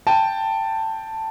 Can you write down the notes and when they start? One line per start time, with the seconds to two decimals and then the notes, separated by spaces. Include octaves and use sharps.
0.07 G5 A5